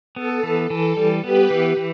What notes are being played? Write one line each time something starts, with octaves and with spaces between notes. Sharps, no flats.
B3 A4
E3
E3 A4
G3
B3 G4 B4
E3
E3